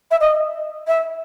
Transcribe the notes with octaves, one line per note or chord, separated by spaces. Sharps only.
E5
D#5
E5